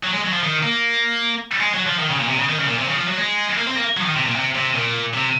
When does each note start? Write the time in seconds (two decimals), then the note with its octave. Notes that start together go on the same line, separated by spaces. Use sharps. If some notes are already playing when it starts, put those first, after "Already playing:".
0.03 F#3
0.13 G#3
0.24 F#3
0.33 F3
0.43 D#3
0.63 A#3
1.60 G#3
1.74 F#3
1.87 F3
2.00 D#3
2.10 C#3
2.19 A#2
2.29 C3
2.39 C#3
2.50 D#3
2.59 C#3
2.68 A#2
2.79 C3
2.88 C#3
2.98 F3
3.08 F#3
3.18 G#3
3.58 A#3
3.67 C4
3.76 A#3
3.97 F#3
4.02 F3
4.06 D#3
4.16 C3
4.26 A#2
4.35 C3
4.55 C3
4.75 A#2
5.14 C3